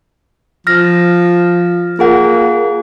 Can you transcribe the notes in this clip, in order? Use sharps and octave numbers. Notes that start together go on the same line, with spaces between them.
F3 F6 A#6
A#3 F4 G#4 F#5